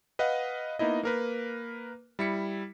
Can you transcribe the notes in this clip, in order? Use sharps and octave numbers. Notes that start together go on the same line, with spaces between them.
B4 D#5 F5 F#5
A#3 B3 D#4 E4 D#5
A#3 A#4 B4
G3 E4 B6 C#7